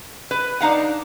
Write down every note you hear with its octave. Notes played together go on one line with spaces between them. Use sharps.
B4
D4 D#4 F5 F#5